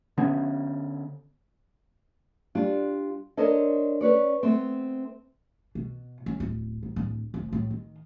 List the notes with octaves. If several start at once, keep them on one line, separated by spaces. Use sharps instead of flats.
D3 B3 C#4
G3 D4 F4
D4 A4 A#4 C5 C#5 D#5
C#4 B4 C#5 D5
A3 B3 C4
B2
C#4
D1
A1
D1
F1
A2
D#3